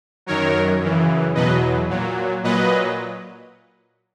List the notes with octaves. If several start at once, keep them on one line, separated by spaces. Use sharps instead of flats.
F#2 D#3 F#3 A#4 C#5
F#2 C#3 E3
E2 B2 F#3 B4 D#5
A#2 F#3
A#2 F#3 B4 D#5